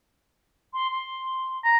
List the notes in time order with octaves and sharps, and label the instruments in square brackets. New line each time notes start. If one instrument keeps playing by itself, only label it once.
[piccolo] C6
C6
[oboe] A#5